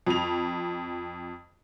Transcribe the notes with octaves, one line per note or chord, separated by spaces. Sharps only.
F2 F7